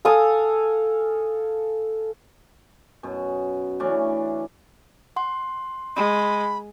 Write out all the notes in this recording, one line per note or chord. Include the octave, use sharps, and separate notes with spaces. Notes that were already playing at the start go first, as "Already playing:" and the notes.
A4 F5 G#5 D#6
F#2 B2
E3 A3 C#4 D4
F#5 C6
G#3 B5